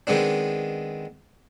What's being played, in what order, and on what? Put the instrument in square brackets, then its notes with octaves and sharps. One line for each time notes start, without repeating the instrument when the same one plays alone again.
[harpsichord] D#3 G#3 B3 C4 D4